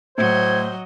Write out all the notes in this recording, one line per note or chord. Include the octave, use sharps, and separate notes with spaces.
A2 F#3 C5 D#5 G#6